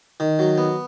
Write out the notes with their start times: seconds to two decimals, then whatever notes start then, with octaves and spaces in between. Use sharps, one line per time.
0.20 D#3
0.39 F#3
0.58 B3